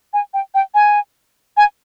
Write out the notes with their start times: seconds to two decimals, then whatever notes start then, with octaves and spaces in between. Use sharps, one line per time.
0.13 G#5
0.34 G5
0.54 G5
0.74 G#5
1.57 G#5